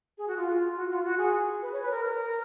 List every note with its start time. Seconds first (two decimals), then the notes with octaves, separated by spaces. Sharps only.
0.18 G#4
0.28 F#4
0.37 F4
0.75 F#4
0.90 F4
1.05 F#4
1.18 G#4
1.62 B4
1.73 C#5
1.82 B4
1.91 A#4
2.05 A#4